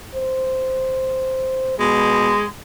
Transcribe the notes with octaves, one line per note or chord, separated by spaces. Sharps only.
C5
B2 G#3